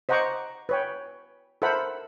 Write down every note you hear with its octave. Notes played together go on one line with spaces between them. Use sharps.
C5 D#5 F#5 A#5 C#6 D6
B4 C#5 G5
A4 A#4 C5 E5 F#5 B5